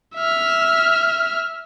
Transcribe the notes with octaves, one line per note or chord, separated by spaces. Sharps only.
E5 F6